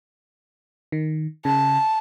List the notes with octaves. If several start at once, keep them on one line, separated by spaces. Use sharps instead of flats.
D#3
C#3 A5